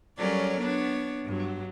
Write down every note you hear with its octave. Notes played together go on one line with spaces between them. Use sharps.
F#3 G3 C#4 A4 A#4 D5
B3 D4 C#5
G2 F#3